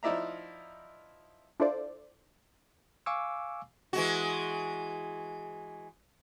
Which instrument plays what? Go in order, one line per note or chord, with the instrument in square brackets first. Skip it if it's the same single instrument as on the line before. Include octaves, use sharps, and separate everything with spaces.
[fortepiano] F3 D#4 E4 D5 E5 A#5
[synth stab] D4 E4 F4 A4 C5 D5
[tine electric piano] F5 G#5 C#6 D6 E6
[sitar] E3 G#3 F#4